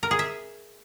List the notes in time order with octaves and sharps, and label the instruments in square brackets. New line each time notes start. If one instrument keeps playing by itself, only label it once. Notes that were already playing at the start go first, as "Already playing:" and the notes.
[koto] A#4
G#4
E5